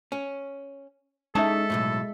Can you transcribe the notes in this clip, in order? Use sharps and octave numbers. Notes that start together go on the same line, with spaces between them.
C#4
G#3 C#4 D#4 A4 E5 A5
B1 E2 A2